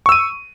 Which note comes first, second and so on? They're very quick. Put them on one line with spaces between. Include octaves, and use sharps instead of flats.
C#6 E6 D#7